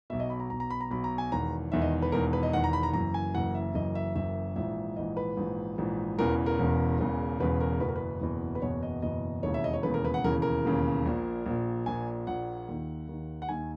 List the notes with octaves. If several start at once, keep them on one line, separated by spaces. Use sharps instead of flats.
B1 B2 E5
D#5
B5
A#5
B1 B2 A#5
A#5
B5
A#5
B1 B2 B5
A#5
G#5
E1 E2 D#3 A#5
E1 E2 D#3 E5
D#5
B4
E1 E2 D#3 A#4
B4
D#5
E1 E2 D#3 F#5
A#5
B5
A#5
F#1 F#2 E3 A#5
G#5
F#1 F#2 E3 F#5
E5
F#1 F#2 E3 D#5
E5
F#1 F#2 E3 E5
A#1 G#2 E3 E5
A#1 G#2 E3 D#5
B4
A#1 G#2 E3
A#1 G#2 E3
E1 E2 C#3 E3 A#4
A#4
E1 E2 C#3 E3
E1 E2 C#3 E3
E1 E2 C#3 E3 B4
A#4
F#1 E2 B2 B4
A#4
B4
F#1 E2 B2
B4
F#1 E2 B2 C#5
D#5
F#1 E2 B2 D#5
E1 D#2 C#3 E3 C#5
E5
D#5
C#5
E1 D#2 C#3 E3 B4
A#4
B4
F#5
E1 D#2 C#3 E3 A#4
A#4
E1 D#2 C#3 E3
A#1 A#2
A#1 A#2
A#1 A#2 G#5
A#1 A#2 F#5
D#2 D#3
D#2 D#3
F#5
D#2 D#3 G#5